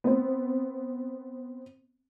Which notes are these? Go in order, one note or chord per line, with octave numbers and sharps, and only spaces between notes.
B3 C4